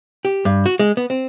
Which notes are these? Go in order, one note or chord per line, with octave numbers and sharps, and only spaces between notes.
G4
G2
F#4
G#3
B3
C4